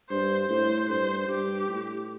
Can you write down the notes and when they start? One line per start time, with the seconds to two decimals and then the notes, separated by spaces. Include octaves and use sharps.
0.10 G2 C5
0.50 A2 C5
0.89 G2 C5
1.29 G2 G4
1.68 A2